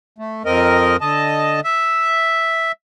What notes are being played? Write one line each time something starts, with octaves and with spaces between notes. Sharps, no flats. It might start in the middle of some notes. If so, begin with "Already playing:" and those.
A3
F2 C4 A#4 D#5
D3 D#5 A5
E5